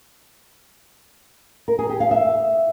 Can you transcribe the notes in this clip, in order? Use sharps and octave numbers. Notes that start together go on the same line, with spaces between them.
A#4
G#4
G4
F5
E5